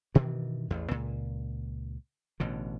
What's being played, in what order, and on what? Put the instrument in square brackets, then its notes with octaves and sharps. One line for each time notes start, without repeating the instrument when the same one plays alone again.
[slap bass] G2 B2 D#3 E3
A1 E2
C#2 A#2
A1 B2 D3